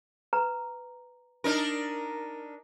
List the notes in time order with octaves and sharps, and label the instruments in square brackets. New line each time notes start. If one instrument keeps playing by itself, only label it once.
[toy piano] B4 A#5
[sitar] D4 D#4 A#4